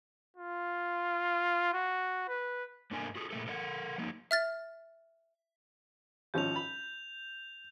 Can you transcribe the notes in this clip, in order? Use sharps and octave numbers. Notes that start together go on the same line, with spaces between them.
F4
F#4
B4
G#2 A#3 D4 A4 A#4 G#5
F#4 G#4 A4
A#2 F#3 A3 G#4 A4
A4 A#4 D#5 F#5
F3 F#3 A3 A#3 D#4
E5 F6 A6
G#1 F3 C#4 G6 F7
B5